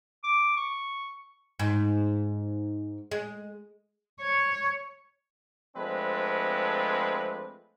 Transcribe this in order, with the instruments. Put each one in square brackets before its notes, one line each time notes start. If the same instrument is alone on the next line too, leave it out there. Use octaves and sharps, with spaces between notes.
[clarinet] D6
C#6
[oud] G#2
G#3
[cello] C#5
[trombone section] F3 G#3 A3 C4 D4 B4